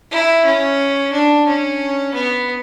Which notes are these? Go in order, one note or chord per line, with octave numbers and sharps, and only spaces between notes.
E4
C#4
D4
C#4
B3